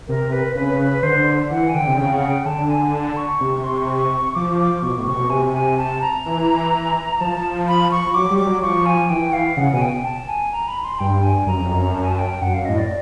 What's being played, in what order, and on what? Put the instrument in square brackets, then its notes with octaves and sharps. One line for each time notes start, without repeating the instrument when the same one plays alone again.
[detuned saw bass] C3 [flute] A#4
[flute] B4
[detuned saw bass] C#3 [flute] B4
[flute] B4
[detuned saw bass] D3 [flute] C5
[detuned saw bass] E3 [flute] F#5
[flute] G#5
[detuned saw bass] D3 [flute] G5
[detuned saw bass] C3
[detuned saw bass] C#3 [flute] G5
[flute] F#5
G5
[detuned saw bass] D3 [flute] A5
[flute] G#5
A5
C#6
[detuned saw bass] C3
[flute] C#6
C6
C#6
[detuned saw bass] F3 [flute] D6
[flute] D6
[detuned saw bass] B2 [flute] C#6
[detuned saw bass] A2
[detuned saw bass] C3 [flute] C#6
[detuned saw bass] B2
[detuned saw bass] C3 [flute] G#5
[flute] G#5
A5
A#5
[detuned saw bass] E3
[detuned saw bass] F3 [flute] A5
[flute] B5
C#6
[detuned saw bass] F3
[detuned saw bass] F#3 [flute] D6
[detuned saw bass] G3
[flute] D6
[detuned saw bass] F#3
[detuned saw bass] F3 [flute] C#6
[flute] G#5
[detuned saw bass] E3 [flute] G5
[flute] F5
[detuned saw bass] C#3 [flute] F#5
[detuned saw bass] B2 [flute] G#5
[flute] G5
A5
G#5
A#5
B5
C6
[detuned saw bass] G2 [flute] G5
[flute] G#5
[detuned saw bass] F#2 [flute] A#5
[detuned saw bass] F2
[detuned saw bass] F#2 [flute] A#5
[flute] A5
G#5
A5
G5
[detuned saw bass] F#2 [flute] F#5
[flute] F5
[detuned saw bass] A2 [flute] D#5
[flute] D5